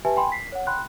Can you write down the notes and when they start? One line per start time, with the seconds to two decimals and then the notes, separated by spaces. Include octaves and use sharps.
0.05 G4 B4 E5 G#5 A5
0.17 G5 G#5 B5 C6
0.32 B6 C7
0.52 C#5 F#5
0.67 G5 B5 C6 F#6